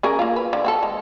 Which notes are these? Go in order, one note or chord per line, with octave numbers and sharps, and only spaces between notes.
C#4 G#4 A#4
A#3 F4
B4
D3
C4 F#4 A4
G#3